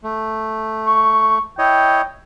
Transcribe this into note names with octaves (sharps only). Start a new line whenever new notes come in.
A3
C#6
E4 C#5 D#5 G5